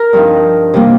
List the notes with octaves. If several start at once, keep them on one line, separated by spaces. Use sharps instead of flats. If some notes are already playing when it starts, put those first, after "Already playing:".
Already playing: A#4
G2 F3 C4 D#4
C3 G3 A#3